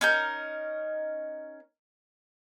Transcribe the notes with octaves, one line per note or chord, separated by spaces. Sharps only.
C#4 D#4 A#4 G6